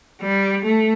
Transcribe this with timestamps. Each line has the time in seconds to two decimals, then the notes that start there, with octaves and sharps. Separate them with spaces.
0.22 G3
0.65 A3